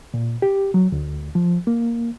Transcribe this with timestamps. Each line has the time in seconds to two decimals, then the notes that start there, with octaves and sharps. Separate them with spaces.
0.14 A#2
0.42 G4
0.74 F#3
0.92 D2
1.35 F3
1.67 A#3